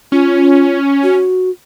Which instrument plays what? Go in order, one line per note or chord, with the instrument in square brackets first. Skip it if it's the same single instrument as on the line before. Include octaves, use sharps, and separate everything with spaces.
[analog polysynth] C#4 [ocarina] F4
[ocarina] F#4